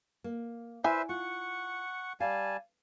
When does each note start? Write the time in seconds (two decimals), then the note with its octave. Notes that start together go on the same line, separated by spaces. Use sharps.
0.24 A#3
0.84 E4 B4 C5 D5 E5 G#5
1.09 F4 F#5 C#6
2.20 G3 F5 G#5 A5